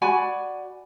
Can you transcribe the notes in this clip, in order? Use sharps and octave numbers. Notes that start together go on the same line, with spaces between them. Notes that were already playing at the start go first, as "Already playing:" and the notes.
F#4 D5 G#5 B5